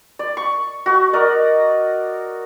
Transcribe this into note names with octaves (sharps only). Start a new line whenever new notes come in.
D5
C#6
F#4 C#6
A#4 D5 D#5